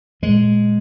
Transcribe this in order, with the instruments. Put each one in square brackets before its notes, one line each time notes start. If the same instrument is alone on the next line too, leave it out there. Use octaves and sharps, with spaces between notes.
[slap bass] A#2 G#3